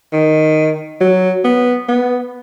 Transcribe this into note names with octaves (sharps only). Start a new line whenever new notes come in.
D#3
F#3
B3
B3